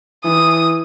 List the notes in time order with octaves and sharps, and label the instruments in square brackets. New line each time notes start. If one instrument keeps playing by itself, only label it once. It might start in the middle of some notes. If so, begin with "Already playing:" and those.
[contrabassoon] E3 [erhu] D#6